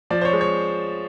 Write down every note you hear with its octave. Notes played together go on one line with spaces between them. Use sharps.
F3 D5
C5
C#5
G#3
C#5